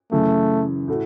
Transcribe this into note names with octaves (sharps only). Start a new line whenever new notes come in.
F#2 C#3 E3 A3
A2 A3 F#4